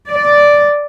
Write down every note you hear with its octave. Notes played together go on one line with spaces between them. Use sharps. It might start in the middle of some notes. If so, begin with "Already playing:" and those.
D5